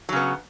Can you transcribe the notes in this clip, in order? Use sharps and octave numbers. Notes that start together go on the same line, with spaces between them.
C#3 F#3 B3